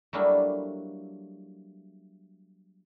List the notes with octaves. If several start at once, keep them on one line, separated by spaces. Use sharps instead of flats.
F#3 G3 A3 A#3 D4 E4